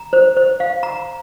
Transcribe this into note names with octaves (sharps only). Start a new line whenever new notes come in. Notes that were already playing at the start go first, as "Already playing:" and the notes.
Already playing: A#5
C5
C5
F5
A#5